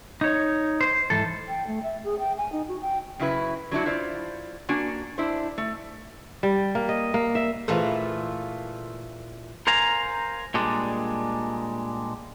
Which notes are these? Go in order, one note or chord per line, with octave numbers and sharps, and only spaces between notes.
D#4 C#5
C5
G#2 E3 A4
G5
A3
E5
G#4
G5
G#5
D#4
F#4
G5
C#3 F#3 E4 B4
F#3 D4 E4 F#4
E4 F4 C5 D5
A#3 D4 F#4 G#5
D4 E4 C5
A3
G3
A#3
D#5
A#3
E5
A#2 E3 A3 E4 F4 G#4 B4 C5
A#4 C5 F5 G#5 A#5
A#2 G3 G#3 D4